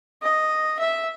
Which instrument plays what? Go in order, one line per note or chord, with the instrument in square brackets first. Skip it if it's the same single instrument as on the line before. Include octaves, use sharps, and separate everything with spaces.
[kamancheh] D#5
E5